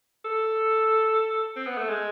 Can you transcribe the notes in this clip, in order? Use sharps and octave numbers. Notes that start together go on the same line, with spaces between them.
A4
C4
B3
A3
G#3